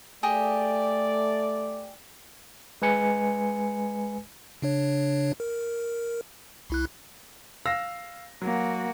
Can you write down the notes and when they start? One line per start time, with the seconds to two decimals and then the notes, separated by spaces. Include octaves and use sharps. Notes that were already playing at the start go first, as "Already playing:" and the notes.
0.23 A3 G4 G#4 D5 D#5
2.82 G#3 B4 G#5 C#7
4.62 C#3 D4 C#5
5.40 A#4
6.70 C2 E4 F#6
7.66 F5 E6 A#6
8.42 F#3 A#3 F#4